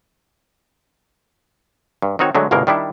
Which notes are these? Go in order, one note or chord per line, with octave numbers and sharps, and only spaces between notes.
G2
D#3 C4 D#4 F#4 C#5
D3 F#3 G#3 A3
G1 C2 B2 G#3 A#3 A#4
D#3 G3 D4 E4